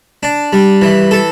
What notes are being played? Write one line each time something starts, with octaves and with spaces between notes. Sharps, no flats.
D4
G3
E3
A4